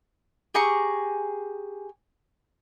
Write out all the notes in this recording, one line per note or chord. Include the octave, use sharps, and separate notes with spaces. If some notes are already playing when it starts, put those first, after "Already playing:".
G4 G#4 A#5 C#6